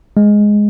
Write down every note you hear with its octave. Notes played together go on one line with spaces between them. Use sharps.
G#3